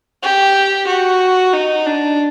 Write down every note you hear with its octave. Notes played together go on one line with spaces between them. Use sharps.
G4
F#4
D#4
D4